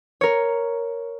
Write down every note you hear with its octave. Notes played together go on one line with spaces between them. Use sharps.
A#4 C#5